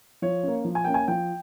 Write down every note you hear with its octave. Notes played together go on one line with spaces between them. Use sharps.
F3 C#5
A#3 C#4
F3
G#5
A#3 C#4 G5
G#5
F3 G5